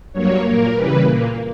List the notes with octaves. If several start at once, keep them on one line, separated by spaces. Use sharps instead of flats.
G2 F#3 A#3 C#5
A#2 A#3 A#4
C#3 E3 G3 B4
A#2 A#3